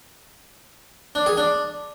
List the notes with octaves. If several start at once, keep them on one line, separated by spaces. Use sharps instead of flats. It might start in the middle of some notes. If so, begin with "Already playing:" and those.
D4
G#4
D4